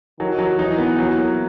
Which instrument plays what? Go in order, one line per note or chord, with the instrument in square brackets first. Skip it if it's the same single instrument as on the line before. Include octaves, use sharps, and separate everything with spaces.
[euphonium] D#3 [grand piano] F#3
[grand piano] F#3
[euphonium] E3 [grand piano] D#4
[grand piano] B3
F#3
A#3